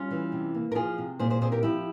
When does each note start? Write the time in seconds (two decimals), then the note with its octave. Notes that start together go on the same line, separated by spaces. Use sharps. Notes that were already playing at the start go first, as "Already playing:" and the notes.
Already playing: G3 C#4 F4
0.11 E3
0.32 C3
0.54 A#3
0.72 A#4
0.75 F3 F4 G#4
0.98 C3
1.19 A#2 G#4 C5
1.30 G#4 C5
1.41 C4 G#4 C5
1.52 G4 A#4
1.63 F3 E4 G4